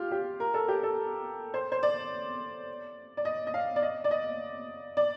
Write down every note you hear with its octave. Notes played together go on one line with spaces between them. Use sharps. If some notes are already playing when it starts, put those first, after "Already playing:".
Already playing: F4 G4 F5
G4
A#4
A4
G4
A4
C5
C5
D5
D5
D#5
D#5
F5
D5
D#5
D5
D#5
D5